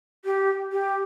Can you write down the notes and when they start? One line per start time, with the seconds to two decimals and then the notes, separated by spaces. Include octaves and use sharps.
0.25 G4
0.72 G4